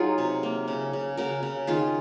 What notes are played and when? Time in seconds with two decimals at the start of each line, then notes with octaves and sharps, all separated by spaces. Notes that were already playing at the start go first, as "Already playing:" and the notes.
Already playing: F#3 D#4 F4 G#4
0.18 C3
0.43 A#3
0.68 C#3
0.93 C#3
1.17 C#3 F#4 A#4
1.43 C#3
1.67 D#3 F4 G#4